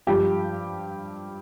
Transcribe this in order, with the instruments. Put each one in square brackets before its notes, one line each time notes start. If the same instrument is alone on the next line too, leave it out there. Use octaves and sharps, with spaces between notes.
[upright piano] G2 F3 G4